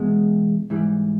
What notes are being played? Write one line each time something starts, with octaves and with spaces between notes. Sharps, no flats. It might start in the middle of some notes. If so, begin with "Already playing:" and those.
Already playing: E2 B2 G#3
G#2 E3 G3